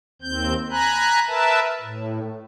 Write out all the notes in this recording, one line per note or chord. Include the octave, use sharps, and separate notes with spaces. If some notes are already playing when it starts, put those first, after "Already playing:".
D#2 C4 G6
G#5 A#5 B5 F#6
A#4 B4 E5 A5
A2